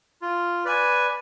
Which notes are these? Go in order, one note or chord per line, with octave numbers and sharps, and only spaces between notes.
F4
B4 D5 G#5